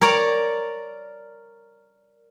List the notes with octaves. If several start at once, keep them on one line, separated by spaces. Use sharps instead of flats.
A#4 C#5 D5 A#5